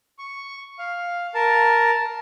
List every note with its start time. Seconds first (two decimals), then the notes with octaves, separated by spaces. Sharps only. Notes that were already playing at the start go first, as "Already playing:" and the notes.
0.19 C#6
0.79 F5
1.34 A#4 A5